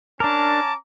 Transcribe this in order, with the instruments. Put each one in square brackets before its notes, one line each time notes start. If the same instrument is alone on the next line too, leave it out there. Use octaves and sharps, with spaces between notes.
[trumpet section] C#4 A#5 D6 [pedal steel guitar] D4 A#4 [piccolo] A5